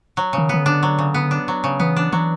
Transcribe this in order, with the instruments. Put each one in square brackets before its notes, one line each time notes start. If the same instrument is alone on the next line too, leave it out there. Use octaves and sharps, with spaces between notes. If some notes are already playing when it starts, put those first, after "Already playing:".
[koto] F#3
C#3
[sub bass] D#3
[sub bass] D#3 [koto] B3
[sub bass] D3
[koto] D4
F#3
C#3
B3
D4
F#3
C#3
[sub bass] E3 [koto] B3
[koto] D4
[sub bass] E3 [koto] F#3